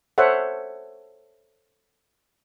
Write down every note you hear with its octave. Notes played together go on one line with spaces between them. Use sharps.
A4 C5 C#5 E5 F#5